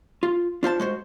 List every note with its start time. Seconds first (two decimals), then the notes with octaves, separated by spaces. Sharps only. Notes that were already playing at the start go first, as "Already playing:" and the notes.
0.23 F4
0.63 D4 F4 C5 A5
0.80 G#3 F#4 C5